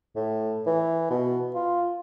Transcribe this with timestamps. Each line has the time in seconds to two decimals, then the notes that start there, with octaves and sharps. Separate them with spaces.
0.16 A2
0.67 E3
1.10 B2
1.55 F4